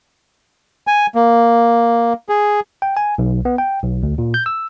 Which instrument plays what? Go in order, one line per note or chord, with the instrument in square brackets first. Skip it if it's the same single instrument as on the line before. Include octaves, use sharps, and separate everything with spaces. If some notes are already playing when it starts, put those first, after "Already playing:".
[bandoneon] G#5
A#3
G#4
[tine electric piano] G5
G#5
B1
B3
G5
B1
D2
A#2
G6
E6